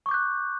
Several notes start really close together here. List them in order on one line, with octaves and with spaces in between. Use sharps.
C#6 D6 G6 F#6